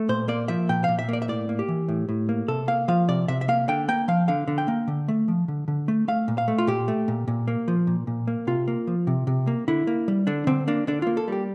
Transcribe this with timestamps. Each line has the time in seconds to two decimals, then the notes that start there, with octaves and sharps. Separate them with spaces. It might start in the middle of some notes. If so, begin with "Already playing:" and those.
Already playing: A3
0.09 A#2 C5
0.28 A#3 D5
0.48 F3 E5
0.69 A#2 G5
0.84 A#2 F5
0.99 E5
1.09 A#3 D5
1.22 E5
1.28 A2 D5
1.49 A#3
1.59 G4
1.68 E3
1.88 A2
2.09 A2
2.29 A#3
2.48 C3 A4
2.68 A#3 F5
2.88 F3 F5
3.08 C3 D5
3.28 C3 E5
3.41 E5
3.48 A#3 F5
3.68 D3 G5
3.88 A#3 G5
4.08 F3 F5
4.28 D3 F5
4.48 D3
4.58 G5
4.68 A#3
4.88 D3
5.08 A3
5.28 F3
5.48 D3
5.68 D3
5.88 A3
6.08 A3 F5
6.28 A#2
6.38 F5
6.48 A3
6.58 F4
6.67 A#2 G4
6.88 A3
7.08 A#2
7.28 A#2
7.48 A#3
7.68 F3
7.87 A#2
8.07 A#2
8.27 A#3
8.47 C3 F4
8.68 A#3
8.87 F3
9.07 C3
9.27 C3
9.47 A#3
9.68 D3 E4
9.87 A#3
10.08 G3
10.27 D3 D4
10.47 D3 C4
10.68 A#3 D4
10.87 D3 D4
11.02 A#3 F4
11.17 A4
11.28 G3 G4